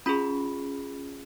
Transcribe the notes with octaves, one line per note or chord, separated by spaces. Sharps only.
C#4 F4 G#4 B5